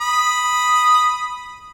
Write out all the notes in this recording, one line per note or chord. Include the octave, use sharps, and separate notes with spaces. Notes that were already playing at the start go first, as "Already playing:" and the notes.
B5 D#6